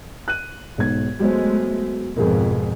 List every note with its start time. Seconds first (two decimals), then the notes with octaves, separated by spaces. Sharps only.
0.28 F#6 D#7
0.78 B1 G#2 G#6
1.20 F#3 G#3 A3 B3 C5
2.17 F2 G#2 B2 G#4 A#4